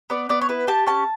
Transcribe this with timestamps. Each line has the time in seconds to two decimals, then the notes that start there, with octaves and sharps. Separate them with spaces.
0.10 B3 D5
0.29 B3 D5
0.41 C#5
0.49 E4 B4
0.67 G4 A5
0.87 C#4 A5